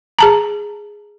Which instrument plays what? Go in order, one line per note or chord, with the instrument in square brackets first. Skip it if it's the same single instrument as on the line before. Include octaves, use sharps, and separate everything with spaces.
[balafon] G#4 A5 A#5